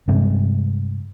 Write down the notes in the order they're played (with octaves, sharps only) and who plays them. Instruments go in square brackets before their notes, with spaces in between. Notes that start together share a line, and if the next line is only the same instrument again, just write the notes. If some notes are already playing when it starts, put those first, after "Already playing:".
[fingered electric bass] G2 C3 G#3